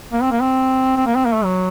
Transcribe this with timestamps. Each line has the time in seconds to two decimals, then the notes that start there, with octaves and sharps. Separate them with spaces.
0.13 A#3
0.22 C4
0.31 A#3
0.42 C4
0.97 C4
1.06 A#3
1.16 C4
1.26 A#3
1.35 A3
1.44 F#3